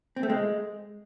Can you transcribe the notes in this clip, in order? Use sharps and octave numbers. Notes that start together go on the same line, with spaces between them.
C4
A3
G#3